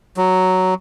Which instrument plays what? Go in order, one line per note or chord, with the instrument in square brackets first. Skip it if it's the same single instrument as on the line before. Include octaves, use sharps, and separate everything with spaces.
[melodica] F#3